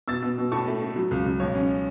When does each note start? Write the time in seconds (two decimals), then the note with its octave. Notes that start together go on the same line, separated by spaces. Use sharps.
0.08 B2 E6 A6
0.22 B2
0.38 B2
0.52 A2 A5 C#6
0.67 A3
0.82 A3
0.96 F#3
1.11 C#2
1.26 C#2
1.40 B1 C#5
1.55 C#4